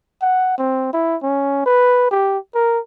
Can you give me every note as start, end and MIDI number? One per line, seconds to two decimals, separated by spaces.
0.22 0.55 78
0.58 0.92 60
0.93 1.16 64
1.23 1.64 61
1.66 2.07 71
2.11 2.38 67
2.55 2.79 70